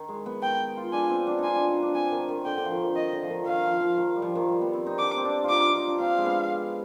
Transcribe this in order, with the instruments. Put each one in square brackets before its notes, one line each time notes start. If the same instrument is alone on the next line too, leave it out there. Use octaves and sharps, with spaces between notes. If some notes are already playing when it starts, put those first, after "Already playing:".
Already playing: [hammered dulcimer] D#3
G#3
B3
[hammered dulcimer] B3 [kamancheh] G5
[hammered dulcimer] F4
[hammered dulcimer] D4 [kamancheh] G#5
[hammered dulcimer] C4
D4
[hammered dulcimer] D#4 F4 [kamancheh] G#5
[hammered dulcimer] D4
D#4
D4
[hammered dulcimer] C4 [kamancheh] G#5
[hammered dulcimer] D#3
D#3
[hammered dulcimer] D3 [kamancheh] G5
[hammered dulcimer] D3
F3
D#3
D#3
[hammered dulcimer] D#3 [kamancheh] D#5
[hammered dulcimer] D3
F3
D#3
[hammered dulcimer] D#3 [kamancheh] F5
[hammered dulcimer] F3
F3
D#3
G3
F3
D#3
G3
B3
C4
D#4
[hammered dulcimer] D4 [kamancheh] D6
[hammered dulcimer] C4
D4
F4
[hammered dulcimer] D#4 [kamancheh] D6
[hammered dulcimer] F4
D#4
D4
[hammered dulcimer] C4 [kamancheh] F5
[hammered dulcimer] G#3
B3